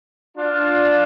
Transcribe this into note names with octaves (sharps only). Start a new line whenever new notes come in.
D4 F4